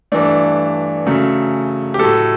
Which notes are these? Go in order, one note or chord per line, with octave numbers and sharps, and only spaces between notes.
G2 E3 A3 D4
F#2 C#3 F#3 A3
G4
A2 F#3 A3 A4